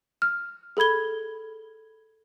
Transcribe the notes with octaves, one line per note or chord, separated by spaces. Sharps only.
F6
G#4 A4 B5 G#6 G7